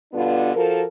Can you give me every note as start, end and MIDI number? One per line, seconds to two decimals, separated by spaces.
0.14 0.55 43
0.14 0.55 47
0.14 0.55 50
0.14 0.55 59
0.14 0.55 62
0.14 0.55 65
0.55 0.83 53
0.55 0.83 66
0.55 0.83 69
0.55 0.83 70